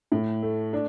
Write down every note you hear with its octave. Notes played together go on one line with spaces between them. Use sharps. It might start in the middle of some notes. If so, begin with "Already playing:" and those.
A2
A3
D4